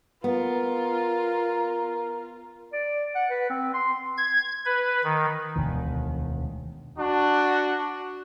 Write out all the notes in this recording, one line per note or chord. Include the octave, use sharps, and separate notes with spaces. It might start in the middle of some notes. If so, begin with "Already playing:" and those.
B3 F4 A#4
D5
F#5
B4
C4
C6
G#6
B4
D#3
E1 D2 D#3
D4 F#4